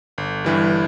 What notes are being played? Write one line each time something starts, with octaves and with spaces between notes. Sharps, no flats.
G1
G2 E3 G3